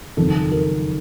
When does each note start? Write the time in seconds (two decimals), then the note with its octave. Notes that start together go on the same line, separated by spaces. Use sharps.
0.17 F#1 F2 D#3 A4
0.52 A#4